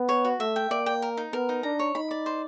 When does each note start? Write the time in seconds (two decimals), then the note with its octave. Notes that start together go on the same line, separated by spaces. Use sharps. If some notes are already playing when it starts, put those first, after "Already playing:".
Already playing: B3
0.09 C#5
0.25 F#4
0.40 A3 E5
0.56 G5
0.70 A#3 D5
0.86 G5
1.02 A#4
1.17 D#4
1.33 B3 A#4
1.49 D#4
1.63 D4 A#5
1.79 C#5
1.95 D#4 B5
2.11 D5
2.26 C5